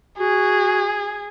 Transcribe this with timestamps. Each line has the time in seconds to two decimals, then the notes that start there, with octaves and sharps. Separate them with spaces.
0.19 F#4 G#4